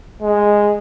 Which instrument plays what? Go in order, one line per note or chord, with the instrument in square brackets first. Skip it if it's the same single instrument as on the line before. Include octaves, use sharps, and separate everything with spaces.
[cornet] G#3